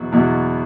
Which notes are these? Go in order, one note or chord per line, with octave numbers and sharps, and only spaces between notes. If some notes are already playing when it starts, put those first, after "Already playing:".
Already playing: E2 B2 F#3
E2 B2 F#3